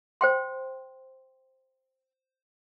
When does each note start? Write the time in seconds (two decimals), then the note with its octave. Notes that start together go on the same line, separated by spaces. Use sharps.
0.21 C5 G5 C6